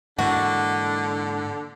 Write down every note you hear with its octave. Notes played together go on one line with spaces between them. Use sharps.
G#2 D3 E3 A#3 F#4